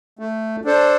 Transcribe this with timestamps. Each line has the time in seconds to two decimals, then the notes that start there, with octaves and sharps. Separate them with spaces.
0.19 A3
0.65 D4 A4 C5